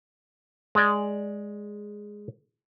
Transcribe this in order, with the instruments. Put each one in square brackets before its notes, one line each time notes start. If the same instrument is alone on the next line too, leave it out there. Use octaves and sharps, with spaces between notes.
[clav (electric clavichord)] G#3 D5